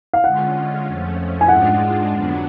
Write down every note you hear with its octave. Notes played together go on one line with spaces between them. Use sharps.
F5
D3 G#3 C#4 F4 F#5
F2 F3 A3 C#4
G#5
G#2 G#3 D4 F4 F#5
F2 D3 F#3 B3 D4